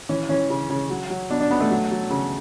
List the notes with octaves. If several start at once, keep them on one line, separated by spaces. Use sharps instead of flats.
E3 C#4
E3 C#4
C#3
C#3
F#3
F#3
B2 D4
D4
B2 B3
A3
F#3
F#3
C#3